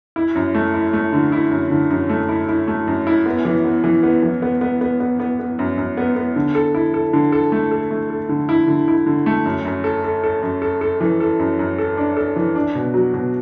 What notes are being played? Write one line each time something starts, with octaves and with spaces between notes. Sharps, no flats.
E4
F#2
A3
E4
A3
D3
E4
F#2
D3
F#2
A3
E4
E4
A3
F#2
E4
B3
E3
B3
E3
B3
E3
B3
B3
B3
B3
B3
B3
F#2
F#2
B3
B3
D3
A4
E4
A4
D3
A4
A3
A4
A3
A4
D3
E4
D3
E4
D3
A3
F#2
F#2
A4
A4
A4
F#2
A4
A4
E3
A4
F#2
F#2
A4
D4
A4
E3
D4
B2
F#3
B2